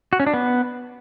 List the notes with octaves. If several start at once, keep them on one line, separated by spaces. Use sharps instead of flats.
F#4
C#4
D4
B3